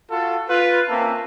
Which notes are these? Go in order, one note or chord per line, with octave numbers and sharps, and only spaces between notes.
F4 F#4 A4
F4 B4
A#3 C4 C#4 E5 A5